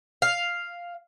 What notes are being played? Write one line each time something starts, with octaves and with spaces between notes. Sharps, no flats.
F5